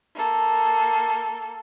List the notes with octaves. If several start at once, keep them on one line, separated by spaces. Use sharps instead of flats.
A#3 A4